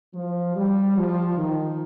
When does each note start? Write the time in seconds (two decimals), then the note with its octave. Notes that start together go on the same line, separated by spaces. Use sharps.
0.14 F3
0.55 G3
0.96 F3
1.37 D#3